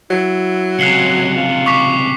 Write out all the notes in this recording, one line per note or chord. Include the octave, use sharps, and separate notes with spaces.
F#3 E4
C#2 C3 F4 F#6 C7 C#7
F4
C#6 D6 B6